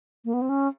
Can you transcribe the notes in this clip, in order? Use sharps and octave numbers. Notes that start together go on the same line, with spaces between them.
A#3
B3
C4
C#4